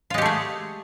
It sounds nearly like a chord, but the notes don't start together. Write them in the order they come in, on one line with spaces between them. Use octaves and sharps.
F4 G#3 G4 A3 G#4